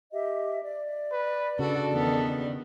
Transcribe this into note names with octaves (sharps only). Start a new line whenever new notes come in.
G4 D#5 E5
D5
B4
C#3 D4 F#4 A4
E2 D#3 B3